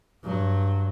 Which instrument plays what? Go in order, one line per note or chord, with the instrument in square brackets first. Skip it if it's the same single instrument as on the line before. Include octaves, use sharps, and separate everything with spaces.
[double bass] G2 F#3